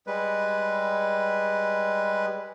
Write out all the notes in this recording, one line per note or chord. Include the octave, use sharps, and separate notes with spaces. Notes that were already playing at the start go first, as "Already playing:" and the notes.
G3 G#3 B4